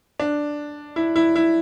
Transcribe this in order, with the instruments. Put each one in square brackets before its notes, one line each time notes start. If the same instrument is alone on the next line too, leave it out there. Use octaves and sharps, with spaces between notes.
[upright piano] D4
E4
E4
E4